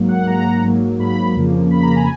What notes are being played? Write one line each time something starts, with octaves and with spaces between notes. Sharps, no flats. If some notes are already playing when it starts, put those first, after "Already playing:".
Already playing: G#2 F#3 A#3
F#5
G#2 F#3 A#3 A#5
G#2 F#3 A#3
G#2 F#3 A#3 B5
F2 C#3 F3 A#3
F2 C#3 F3 A#3 B5
A#5
G#5